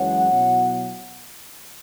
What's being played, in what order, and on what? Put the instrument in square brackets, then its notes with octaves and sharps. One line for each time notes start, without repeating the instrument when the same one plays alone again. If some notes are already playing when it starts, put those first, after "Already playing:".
Already playing: [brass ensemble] F#2 E3 G#3 C#4 E4 C#5 F#5
B2 F#3 E4